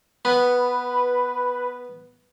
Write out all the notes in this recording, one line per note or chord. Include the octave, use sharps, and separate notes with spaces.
B3 B4